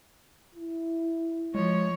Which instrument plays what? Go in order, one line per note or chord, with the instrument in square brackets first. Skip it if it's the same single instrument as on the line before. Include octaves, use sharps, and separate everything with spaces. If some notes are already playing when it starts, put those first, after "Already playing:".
[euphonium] E4
[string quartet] F3 [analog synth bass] G#3 [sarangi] C#5